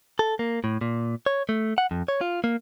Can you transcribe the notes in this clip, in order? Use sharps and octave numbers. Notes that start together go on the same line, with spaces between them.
A4
A#3
A2
A#2
C#5
A3
F#5
F2
C#5
F4
A#3